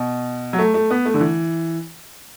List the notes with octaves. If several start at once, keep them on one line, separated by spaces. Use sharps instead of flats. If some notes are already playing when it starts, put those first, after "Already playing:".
Already playing: B2
F#3
A3
A3
B3
A3
D3
E3